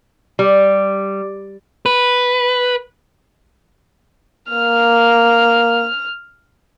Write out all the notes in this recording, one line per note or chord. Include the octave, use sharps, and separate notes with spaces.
G3
B4
A#3 F6